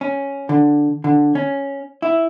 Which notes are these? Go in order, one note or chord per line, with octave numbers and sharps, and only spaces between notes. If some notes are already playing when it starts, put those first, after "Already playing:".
C#4
D3
D3
C#4
E4